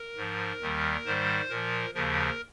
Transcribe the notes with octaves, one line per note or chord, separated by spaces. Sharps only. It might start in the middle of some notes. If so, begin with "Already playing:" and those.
Already playing: A#4
G#2 F3
D#2 D#3 G3
G#2 D#3 G3 C5
A#2 F3 A#4
D#2 C#3 F3 A#4